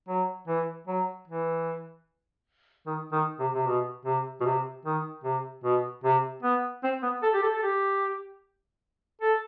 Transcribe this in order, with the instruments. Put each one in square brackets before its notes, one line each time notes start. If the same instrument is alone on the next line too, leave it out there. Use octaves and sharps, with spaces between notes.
[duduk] F#3
E3
F#3
E3
D#3
D#3
C3
C3
B2
C3
B2
C3
D#3
C3
B2
C3
B3
C4
B3
A4
G4
A4
A4
G4
A4